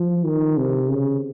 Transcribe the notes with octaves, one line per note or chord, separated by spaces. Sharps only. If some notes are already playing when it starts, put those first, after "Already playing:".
Already playing: F3
D#3
C3
C#3